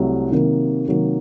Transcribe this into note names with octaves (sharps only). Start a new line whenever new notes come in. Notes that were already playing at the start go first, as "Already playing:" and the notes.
Already playing: C2 C3 F#3 A3
C3 D#3 F#3 A#3
C3 D#3 F#3 A#3